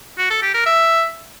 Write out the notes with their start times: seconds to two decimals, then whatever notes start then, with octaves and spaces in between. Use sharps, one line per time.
0.18 F#4
0.30 A4
0.42 G4
0.54 A#4
0.66 E5